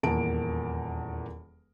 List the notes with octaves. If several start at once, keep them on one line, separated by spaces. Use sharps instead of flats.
D#1 E2 A#3 A#4 A5 D7